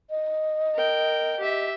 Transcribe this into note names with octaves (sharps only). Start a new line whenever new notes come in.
D#5
A#4 G5
G4 E5